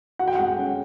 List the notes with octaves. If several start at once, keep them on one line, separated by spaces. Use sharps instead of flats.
F#4 F#5
G5
G#3 F#5
C#4